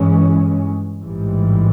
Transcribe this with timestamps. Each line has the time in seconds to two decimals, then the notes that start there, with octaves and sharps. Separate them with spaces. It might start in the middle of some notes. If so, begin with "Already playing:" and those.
Already playing: G2 E3 G#3 C#4
1.01 A1 G#2 E3 G3